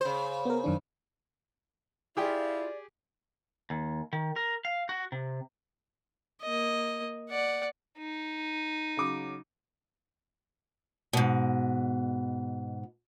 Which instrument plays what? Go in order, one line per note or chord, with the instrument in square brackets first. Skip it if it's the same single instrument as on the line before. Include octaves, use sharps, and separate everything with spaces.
[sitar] C#3 C5
[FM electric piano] B3 A#4
F#2 D#3 D4
[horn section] E4 F4 [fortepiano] G4 G#4 G5 [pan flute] D5
[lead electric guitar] D#2
D#3
A#4
F5
F#4
C3
[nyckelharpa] A#3 D#5
D5 F#5
[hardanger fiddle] D#4
[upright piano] C#3 F#3 D6
[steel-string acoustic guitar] G#2 B2